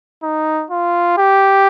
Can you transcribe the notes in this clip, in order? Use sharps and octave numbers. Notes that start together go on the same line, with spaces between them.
D#4
F4
G4